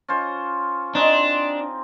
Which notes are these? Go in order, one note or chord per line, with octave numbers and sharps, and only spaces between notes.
C#4 F4 C5
C4 D4 D#4 G#4